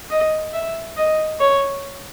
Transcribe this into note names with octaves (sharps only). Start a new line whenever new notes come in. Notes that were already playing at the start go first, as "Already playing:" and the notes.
D#5
E5
D#5
C#5